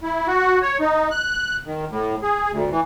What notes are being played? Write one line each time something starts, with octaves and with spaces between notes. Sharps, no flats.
E4
F#4
C#5
D#4
F#6
D#3
A2
G#4
D2
E3